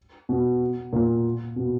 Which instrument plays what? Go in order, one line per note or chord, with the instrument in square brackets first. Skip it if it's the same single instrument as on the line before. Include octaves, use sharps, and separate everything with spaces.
[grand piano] B2
A#2
B2